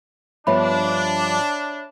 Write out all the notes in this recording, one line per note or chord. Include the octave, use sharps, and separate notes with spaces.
G2 F3 B3 D4 C#5 E5 B5